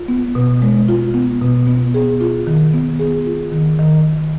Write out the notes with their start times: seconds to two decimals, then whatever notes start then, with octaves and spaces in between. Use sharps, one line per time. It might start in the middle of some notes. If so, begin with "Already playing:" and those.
Already playing: F4
0.08 B3
0.35 B2
0.62 G#3
0.89 F4
1.14 B3
1.42 B2
1.67 B3
1.94 G#4
2.21 F4
2.47 D#3
2.74 B3
2.99 G#4
3.26 F4
3.52 D#3
3.79 D#3